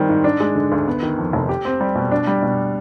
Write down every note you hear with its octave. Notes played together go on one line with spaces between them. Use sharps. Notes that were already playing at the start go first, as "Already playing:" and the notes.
Already playing: D#3 G3 C4
G#2
D4
G#3
D3
D2
B3
D#3
F2
F1
G4
C4
G3
B2
D4
G3
B2